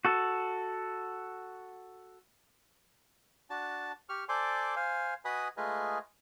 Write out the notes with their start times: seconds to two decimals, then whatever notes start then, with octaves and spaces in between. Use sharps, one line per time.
0.05 F#4 A4
3.50 D4 F#4 A5
4.09 G4 C#6 F6
4.29 A4 C5 D5 G#5 C6 D6
4.76 C5 F5 G#5
5.25 F#4 B4 D#5 G#5 B5 D#6
5.57 G#3 A3 F4 G#4 B4 D#5